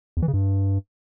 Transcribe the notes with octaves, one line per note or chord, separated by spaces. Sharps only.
E2
E3
C#3
G2